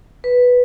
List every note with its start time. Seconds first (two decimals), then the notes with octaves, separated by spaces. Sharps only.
0.24 B4